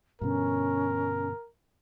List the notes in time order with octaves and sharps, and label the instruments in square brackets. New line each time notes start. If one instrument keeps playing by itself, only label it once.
[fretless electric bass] G2 B2 D3 [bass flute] C#4 [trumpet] A#4